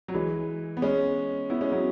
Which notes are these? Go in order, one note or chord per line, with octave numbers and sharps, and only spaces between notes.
F#3
E3 G#3
B3
G#3 C#4
B3 E4
G#3 C#4
F#3 B3